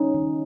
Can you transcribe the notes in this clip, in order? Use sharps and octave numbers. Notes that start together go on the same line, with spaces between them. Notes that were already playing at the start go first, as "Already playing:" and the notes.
Already playing: G3 C#4 D#4
D#3